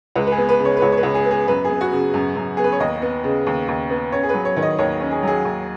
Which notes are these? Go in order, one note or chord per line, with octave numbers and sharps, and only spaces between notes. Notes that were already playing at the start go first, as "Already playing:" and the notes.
C#2 B4
B4
G#4
B3
B4
C#3
C#5
B4
C#2 C#5
C#5
B4
C#2
G#4
B3
G#4
F#2 B4
G#4
B3
F#4
C#3
F#2
F#2
B3 G#4
B4
C#5
D#2 D#5
B3
C#3
D#2
D#2
B3
C#4 C#5
G#4
F#3 B4
C#5
D#3 C#5
D#5
D#2 C#5
C#4
G#4
F#3 G#4
D#2